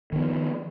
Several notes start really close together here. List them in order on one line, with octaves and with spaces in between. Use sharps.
D#3 B3 F3